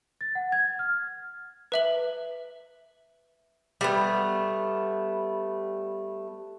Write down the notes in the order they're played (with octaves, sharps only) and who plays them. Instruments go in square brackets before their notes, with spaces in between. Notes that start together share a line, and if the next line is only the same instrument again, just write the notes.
[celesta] A6
F#5
G#6
F6
[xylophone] B4 E5 F#7
[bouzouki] G3 A3 B3